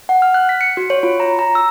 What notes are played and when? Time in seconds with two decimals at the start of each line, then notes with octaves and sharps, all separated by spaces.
0.09 F#5
0.22 F6
0.34 F#6
0.49 B6
0.61 C#7
0.77 F#4
0.90 C#5
1.03 F4
1.20 A#5
1.39 A#5
1.55 E6